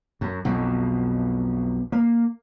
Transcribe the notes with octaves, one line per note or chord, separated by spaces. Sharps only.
F#2
B1 F2 B2
A#3